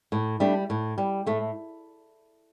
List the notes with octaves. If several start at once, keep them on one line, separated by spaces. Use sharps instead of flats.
A2
G3 A3 D4
A2
G3
A2 A3